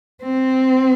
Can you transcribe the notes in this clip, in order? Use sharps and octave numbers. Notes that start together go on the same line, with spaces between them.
C4